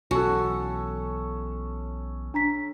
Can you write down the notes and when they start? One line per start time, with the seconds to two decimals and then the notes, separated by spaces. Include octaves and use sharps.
0.11 B1 E3 C#4 F#4 A4
2.34 D4 A#5 B6